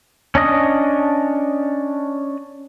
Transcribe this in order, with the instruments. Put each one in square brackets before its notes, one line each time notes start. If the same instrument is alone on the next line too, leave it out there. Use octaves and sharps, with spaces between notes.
[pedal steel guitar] C#4 D4 D#5 D#6